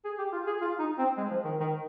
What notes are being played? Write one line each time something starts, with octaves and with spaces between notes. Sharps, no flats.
G#4
G4
F4
G#4
F4
D#4
C4
G#3
F3
D#3
D#3